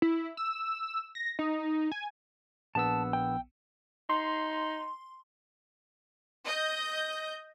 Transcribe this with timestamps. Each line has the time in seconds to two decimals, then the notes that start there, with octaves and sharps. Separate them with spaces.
0.02 E4
0.37 E6
1.15 A#6
1.39 D#4
1.92 G#5
2.75 A#1 B3 A5 E6
3.13 G5
4.10 D#4 C6
6.45 D#5 G6